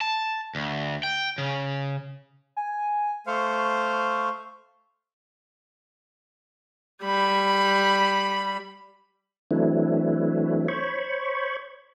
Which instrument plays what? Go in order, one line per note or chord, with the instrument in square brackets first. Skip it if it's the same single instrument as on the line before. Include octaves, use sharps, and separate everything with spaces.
[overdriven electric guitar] A5
D2
G5
C#3
[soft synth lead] G#5
[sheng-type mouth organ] A3 C5 F5 [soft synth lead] C#6
[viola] G3 B5
[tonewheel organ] E3 F#3 A3 C4 D4 E4
C5 C#5 B5 C#6